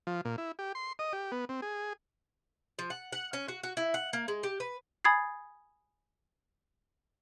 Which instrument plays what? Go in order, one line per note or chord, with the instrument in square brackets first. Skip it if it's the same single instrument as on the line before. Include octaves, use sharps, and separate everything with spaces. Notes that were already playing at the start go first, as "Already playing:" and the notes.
[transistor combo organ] F3
A#2
E4
G4
C6
D#5
G4
B3
C4
G#4
[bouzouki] F3
F#5
F#5
C#4
F#4
F#4
E4
F#5
A#3
G#3
G4
B4
[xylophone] G#5 B5 D#6 G#6 A6 C7